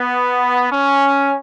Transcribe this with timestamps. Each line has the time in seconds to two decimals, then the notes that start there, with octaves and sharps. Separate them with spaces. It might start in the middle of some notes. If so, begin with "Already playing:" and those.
Already playing: B3
0.72 C#4